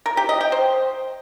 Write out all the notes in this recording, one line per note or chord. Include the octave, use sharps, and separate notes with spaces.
A#4
G4
D#5
G5
C5